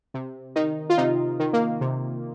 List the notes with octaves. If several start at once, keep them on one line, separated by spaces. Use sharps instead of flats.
C3
D#3 D#4
F4
C3 D#4
D#3
A#3
C3